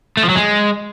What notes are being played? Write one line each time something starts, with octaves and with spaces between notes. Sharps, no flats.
A3
F3
F#3
G#3